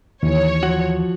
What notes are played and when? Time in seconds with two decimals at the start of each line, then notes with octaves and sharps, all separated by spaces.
0.23 D#2 E3 C#5
0.63 F3 F#4